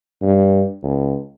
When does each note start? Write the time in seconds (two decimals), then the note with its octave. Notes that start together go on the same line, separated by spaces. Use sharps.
0.22 G2
0.83 C#2